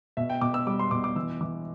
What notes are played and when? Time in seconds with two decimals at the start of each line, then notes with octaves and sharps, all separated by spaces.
0.17 B2 E5
0.30 G5
0.41 B2 D6
0.54 E6
0.67 G3 D6
0.79 C6
0.91 B2 D6
1.04 D6
1.16 E3 E6
1.41 E3 D6